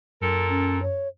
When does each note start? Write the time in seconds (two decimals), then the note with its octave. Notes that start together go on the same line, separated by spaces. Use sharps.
0.21 F#2 A#2 A4 A#4
0.49 C#4
0.82 C#5